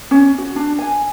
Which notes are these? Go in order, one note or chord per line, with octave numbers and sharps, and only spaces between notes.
C#4
F#4
D4
G#5